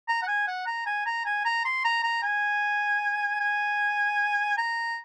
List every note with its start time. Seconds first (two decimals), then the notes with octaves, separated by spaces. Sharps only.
0.08 A#5
0.23 F#5
0.28 G#5
0.47 F#5
0.66 A#5
0.86 G#5
1.06 A#5
1.26 G#5
1.45 A#5
1.65 C6
1.85 A#5
2.04 A#5
2.23 G#5
3.40 G#5
4.58 A#5